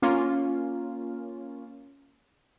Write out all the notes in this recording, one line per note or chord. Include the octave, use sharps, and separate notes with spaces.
A#3 C#4 F4